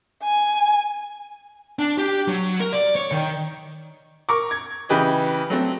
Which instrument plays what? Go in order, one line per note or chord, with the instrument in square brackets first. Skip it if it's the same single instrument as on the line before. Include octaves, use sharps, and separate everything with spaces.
[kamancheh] G#5
[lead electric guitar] D4
G4
F#3
A#4
D5
C#5
D#3
[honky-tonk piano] A#4 C#6 D6
G#6
C#3 E3 G4 B4 D#5
F#3 A3 C4